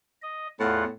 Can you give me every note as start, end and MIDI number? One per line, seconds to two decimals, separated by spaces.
0.22 0.47 75
0.60 0.84 40
0.60 0.93 45
0.60 0.84 65
0.60 0.84 78